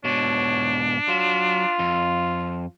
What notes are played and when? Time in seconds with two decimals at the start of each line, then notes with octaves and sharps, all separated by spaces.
0.05 G#2 B2 D4 C#5
1.08 F#3 F4
1.79 F2